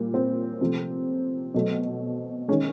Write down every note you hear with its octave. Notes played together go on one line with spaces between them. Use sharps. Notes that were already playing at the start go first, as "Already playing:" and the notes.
Already playing: A#2 G3
C4
C3 F3 A3
B2 F#3 A3
D#3 G#3 C#4